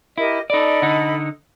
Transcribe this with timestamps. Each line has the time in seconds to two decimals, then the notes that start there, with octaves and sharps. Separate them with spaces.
0.18 E4 G4 A#4 D#5
0.50 D#4 A4 D5 D#5 B5
0.82 D3 D#4